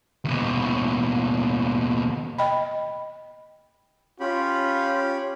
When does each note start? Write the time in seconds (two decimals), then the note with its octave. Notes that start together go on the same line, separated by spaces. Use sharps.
0.25 D#2 B2
2.38 D#5 G5 B5
4.20 C#4 F4 G4 B5